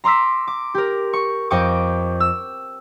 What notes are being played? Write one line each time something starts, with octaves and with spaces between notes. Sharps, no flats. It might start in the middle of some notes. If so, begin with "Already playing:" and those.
A#5 C6 D6 E6 B6
D6
G4 A#4
C#6
F2 D#5 G5 C#6 D6
E6